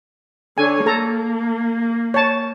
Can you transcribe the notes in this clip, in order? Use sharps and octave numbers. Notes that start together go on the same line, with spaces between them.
D3 C#5 G#5
A#3 A4 A#5
C#5 A5